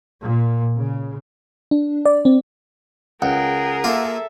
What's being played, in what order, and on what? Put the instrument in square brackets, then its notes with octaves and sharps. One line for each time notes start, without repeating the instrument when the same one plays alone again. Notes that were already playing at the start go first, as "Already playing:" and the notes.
[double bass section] A#2
C#3
[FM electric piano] D4
D5
C4
[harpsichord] C#2 [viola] G#4 A#4 [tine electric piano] F#5 [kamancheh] G5
[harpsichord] A#3 F4 [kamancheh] A4 E5